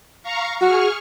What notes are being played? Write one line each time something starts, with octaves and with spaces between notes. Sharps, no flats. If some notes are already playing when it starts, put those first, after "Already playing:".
F5 A#5 C#6
F#4 G#4 C#6 F6